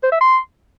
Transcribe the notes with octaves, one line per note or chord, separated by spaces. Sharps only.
C5
E5
C6